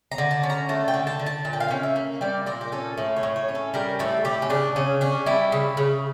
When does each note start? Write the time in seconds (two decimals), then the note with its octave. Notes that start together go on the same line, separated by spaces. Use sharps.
0.12 A#5
0.18 D3
0.31 A5
0.43 C#4
0.50 A#5
0.69 A3 A5
0.88 G5
0.94 D3
1.07 A5
1.20 D3
1.26 A5
1.45 A#2 A5
1.53 G5
1.60 F5
1.68 C#4 G5
1.83 E5
1.96 A#3
2.21 G3 D5
2.46 A#2 A#4
2.61 G4
2.72 C#4 A4
2.98 A2 A4
3.17 C#5
3.23 A2
3.36 C#5
3.49 C#4
3.55 A4
3.74 G3 A#4
3.99 A2 A4
4.25 A2 G4
4.42 C#4
4.50 C#3 D4
4.76 C#3 C#4
5.01 C#4 D4
5.26 G3 E4
5.52 C#3
5.77 C#3